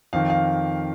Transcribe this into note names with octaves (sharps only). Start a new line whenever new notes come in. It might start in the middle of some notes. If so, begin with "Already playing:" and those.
F2 D#3 F5
F5